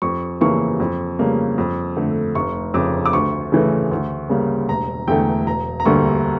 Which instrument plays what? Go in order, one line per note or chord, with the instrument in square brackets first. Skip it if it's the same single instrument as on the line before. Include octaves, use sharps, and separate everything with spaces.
[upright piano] F2 C#6
C#3 E3 A#3 C#6
F2
C#3 G3 A#3
F2
D3 A3
F1 C#6
F2 C#3 D6
D6
D2 C#6
C#3 E3 A3
D2
C#3 G3 A#3
E1 A#5
E2 D3 A3 G5
E1 A#5
A#5
D2 D3 G3 A#3 C#6